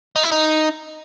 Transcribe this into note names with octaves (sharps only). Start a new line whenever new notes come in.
D#4
E4
D#4